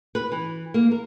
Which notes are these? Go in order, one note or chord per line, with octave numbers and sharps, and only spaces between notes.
B4
E3
A#3
A#4